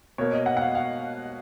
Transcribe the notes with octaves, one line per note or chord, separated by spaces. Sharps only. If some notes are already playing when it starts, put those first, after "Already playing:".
B2 A#3 C#5
D#5
F#5
F#5
F5
F5